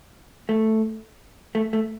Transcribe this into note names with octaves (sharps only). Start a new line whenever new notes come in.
A3
A3
A3